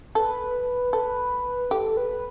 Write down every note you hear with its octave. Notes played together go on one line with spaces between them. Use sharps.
A4 B4
A4 B4
G4 A4
B4